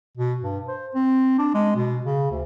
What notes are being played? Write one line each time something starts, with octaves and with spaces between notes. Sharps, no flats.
B2
G2
C5
C4
D4
G#3
B2
C#3
D2